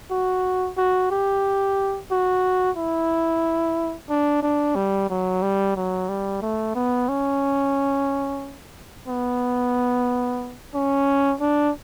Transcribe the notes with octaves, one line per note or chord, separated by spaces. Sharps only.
F#4
F#4
G4
F#4
E4
D4
D4
G3
F#3
G3
F#3
G3
A3
B3
C#4
B3
C#4
D4